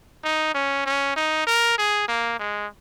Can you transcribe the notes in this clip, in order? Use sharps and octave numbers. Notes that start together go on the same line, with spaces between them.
D#4
C#4
C#4
D#4
A#4
G#4
A#3
G#3